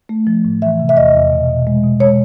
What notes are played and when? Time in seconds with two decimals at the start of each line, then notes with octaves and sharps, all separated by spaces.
0.09 A3
0.27 F3
0.45 A2
0.62 E3 E5
0.80 C3
0.89 E5
0.97 E2 D#5
1.15 E2
1.32 B2
1.49 B2
1.67 G#3
1.84 B2
2.00 G#3 C#5